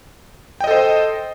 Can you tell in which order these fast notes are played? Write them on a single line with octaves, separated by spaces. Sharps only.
G5 D#5 A4 C5